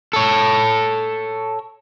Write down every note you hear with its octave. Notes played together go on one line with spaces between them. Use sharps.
A4 C#5